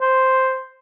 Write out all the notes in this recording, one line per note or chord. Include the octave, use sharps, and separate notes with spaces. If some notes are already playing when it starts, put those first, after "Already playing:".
C5